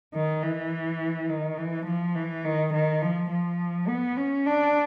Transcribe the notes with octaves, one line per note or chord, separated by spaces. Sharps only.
D#3
E3
D#3
E3
F3
E3
D#3
D#3
F3
F3
B3
C#4
D4